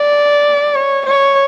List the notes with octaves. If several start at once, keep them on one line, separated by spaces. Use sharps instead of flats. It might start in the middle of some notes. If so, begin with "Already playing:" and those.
Already playing: D5
C#5
C#5